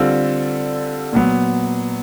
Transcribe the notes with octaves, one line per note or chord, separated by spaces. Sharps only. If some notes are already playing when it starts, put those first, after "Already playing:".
Already playing: D3 G3 C4 F4 A4
A#2 F#3 B3